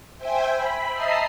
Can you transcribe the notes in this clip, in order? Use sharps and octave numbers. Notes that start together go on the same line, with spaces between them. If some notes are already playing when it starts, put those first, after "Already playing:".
C5 E5 G5 G#5
B5
D#5 E5 A5 A#5 D#6 C7